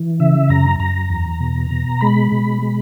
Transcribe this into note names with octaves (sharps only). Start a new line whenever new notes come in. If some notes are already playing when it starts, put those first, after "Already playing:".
Already playing: E3
C#3 E5
F#2 A#5
F#2 A#5
E2
B2
B2
G#3 B5
B2
G#3